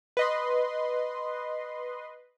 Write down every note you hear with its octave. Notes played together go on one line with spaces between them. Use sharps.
B4 D#5 C6